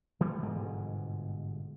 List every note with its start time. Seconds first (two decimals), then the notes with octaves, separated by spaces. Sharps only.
0.20 E3 G3 A3
0.42 G1 G#2 B2 G#3